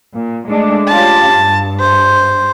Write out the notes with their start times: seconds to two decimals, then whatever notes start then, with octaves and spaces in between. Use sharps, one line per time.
0.15 A#2
0.47 G#3 A3 D4
0.88 C#4 F4 G4 A5
1.36 G2
1.80 C5